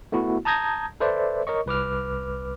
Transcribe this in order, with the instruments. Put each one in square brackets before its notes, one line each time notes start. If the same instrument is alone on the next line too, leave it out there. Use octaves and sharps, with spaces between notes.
[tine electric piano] A3 B3 E4 F#4
A5 A#5 D#6 G6 G#6 A#6
A4 B4 C5 D5 E5
A#4 C#5 D#5 C#6
C2 B4 D6 F6